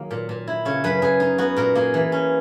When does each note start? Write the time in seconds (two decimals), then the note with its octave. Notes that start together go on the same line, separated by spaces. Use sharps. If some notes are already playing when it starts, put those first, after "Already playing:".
Already playing: D#3 F#3 A#3 G#4
0.11 A#2
0.29 A#2
0.47 E4
0.65 C#3 C#5
0.84 F#2 B4
1.02 F#2 G#4
1.20 D#4
1.38 B3 F#4
1.56 A#2 A#4
1.75 A#3 G#4
1.94 E3
2.12 C#4